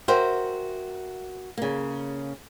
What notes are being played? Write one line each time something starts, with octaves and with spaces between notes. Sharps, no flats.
F#4 A#4 C5 E5 G5
C#3 A#3